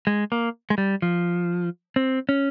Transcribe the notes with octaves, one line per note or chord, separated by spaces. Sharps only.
G#3
A#3
G#3
G3
F3
C4
C#4